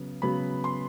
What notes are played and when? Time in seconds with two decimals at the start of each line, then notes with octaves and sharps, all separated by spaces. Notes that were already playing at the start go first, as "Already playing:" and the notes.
Already playing: C#3 F#3 B3
0.22 C#3 F#3 B3 B5
0.64 C6